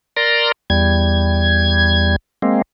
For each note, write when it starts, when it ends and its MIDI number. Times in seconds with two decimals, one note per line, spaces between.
0.16 0.52 70
0.16 0.52 74
0.16 0.52 82
0.16 0.52 84
0.70 2.16 40
0.70 2.16 55
0.70 2.16 92
2.42 2.62 56
2.42 2.62 58
2.42 2.62 60